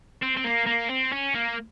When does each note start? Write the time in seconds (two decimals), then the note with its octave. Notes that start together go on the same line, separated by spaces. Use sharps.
0.23 C4
0.37 C4
0.44 A#3
0.67 A#3
0.89 C4
1.12 C#4
1.35 A#3